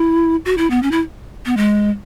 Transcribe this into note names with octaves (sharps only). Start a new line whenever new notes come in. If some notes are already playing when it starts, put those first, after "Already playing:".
Already playing: E4
F#4
E4
B3
C#4
E4
B3
G#3